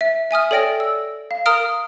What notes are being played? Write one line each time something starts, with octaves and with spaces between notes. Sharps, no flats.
E5
E5 G#5 D#6 F6
A4 C#5 D5 G5 A#6 D7
E6
F5
A#4 A#5 D#6 F6 D7